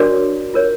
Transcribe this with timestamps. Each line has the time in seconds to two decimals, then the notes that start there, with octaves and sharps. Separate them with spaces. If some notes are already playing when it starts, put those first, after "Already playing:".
Already playing: D4 F#4 A#4 C#5 D5 D6
0.54 F4 A#4 C#5